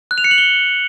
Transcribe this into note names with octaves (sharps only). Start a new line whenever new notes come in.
F#6
F7
C#7
F#7
G7